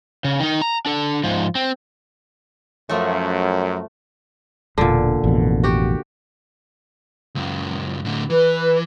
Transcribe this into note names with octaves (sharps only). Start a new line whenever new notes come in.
C#3
D#3 D#4
A#5
D4 A4
G#2 F3
C4
F#2 F3 A3
E1 A#2 D3
A1 F2 B2
F#4 G4
C#2 F#2
A2 D3
E3 B4